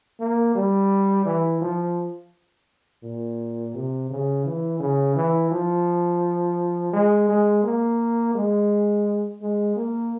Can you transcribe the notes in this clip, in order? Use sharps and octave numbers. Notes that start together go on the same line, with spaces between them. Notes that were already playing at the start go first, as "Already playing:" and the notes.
A#3
G3
E3
F3
A#2
C3
C#3
E3
C#3
E3
F3
G#3
G#3
A#3
G#3
G#3
A#3